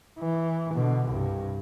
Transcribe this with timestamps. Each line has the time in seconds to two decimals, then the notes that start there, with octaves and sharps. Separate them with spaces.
0.20 E3
0.74 B2 D3
1.08 C2 G2